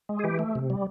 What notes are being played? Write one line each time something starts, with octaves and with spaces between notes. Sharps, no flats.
G#3
G#4
E3 G4
A3
C3
G3